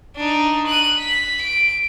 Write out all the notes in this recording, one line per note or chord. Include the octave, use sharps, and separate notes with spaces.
D4 D#4
F#6 D#7
B6
D7